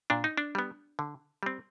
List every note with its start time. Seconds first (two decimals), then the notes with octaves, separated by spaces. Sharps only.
0.10 A#2 D4
0.24 D#4
0.37 D4
0.55 G3 B3
0.99 D3
1.43 G3 C4